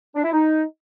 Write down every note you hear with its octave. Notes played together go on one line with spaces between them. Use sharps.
D4
E4
D#4